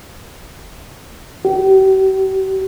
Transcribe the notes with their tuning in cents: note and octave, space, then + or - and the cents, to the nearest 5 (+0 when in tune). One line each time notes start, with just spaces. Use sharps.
G4 -45